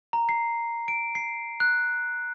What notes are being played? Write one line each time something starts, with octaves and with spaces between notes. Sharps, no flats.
A#5
C7
D7
C7
F#6